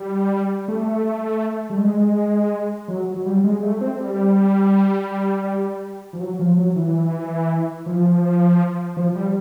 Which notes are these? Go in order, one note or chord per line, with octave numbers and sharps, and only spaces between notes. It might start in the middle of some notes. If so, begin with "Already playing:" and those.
Already playing: G3
A3
G3
G#3
F#3
F#3
G3
G#3
A3
C4
G3
F3
F#3
F3
F#3
E3
F3
F3
G3